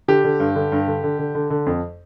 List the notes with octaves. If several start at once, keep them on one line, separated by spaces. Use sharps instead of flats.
D3 G4
D3
G2
D3
G2
D3
D3
D3
D3
D3
F2